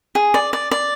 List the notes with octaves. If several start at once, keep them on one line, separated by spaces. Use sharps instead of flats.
G#4
D5
D5
D5